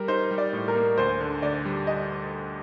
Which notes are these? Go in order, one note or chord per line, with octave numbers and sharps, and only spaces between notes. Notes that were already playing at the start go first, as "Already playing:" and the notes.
Already playing: G3 A#4
D#4 C5
G3
D5
A2
A#4
A#3
D2 C5
D3
D2 D5
G3
D#5